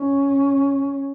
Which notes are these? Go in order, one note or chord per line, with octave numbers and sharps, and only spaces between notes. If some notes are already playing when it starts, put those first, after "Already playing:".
Already playing: C#4